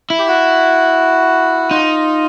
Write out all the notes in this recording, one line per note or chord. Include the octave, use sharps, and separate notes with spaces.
E4
G4
F#4
D#4 F4